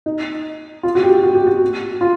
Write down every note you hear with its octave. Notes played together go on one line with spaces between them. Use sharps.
D#4
F4
F#4
G4
F#4
G4
F#4
F4